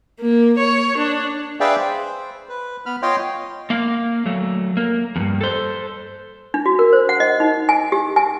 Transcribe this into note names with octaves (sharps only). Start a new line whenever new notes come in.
A#3
C#5
D4
G#4 B4 D5 E5 F5 G5
C5
B4
B3 B5 F6
F4 C#5 D#5 F5 G5 C6
A#3 F5
F#3 A3
A#3
E2 G2
A4 C5
D4
F#4
A#4
C5
F#5
D#5
D#4
G#5
G4
G#5